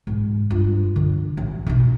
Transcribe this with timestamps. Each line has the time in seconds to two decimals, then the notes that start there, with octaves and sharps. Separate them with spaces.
0.07 G#2
0.50 G2 F4
0.96 D3
1.37 A1
1.66 B2 D#4